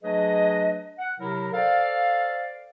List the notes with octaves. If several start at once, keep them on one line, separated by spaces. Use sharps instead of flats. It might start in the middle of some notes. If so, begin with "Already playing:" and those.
F#3 A3 D4 G#4 B4 D#5
F#5
C3 F#3 E4 A#4
A4 C5 D5 F5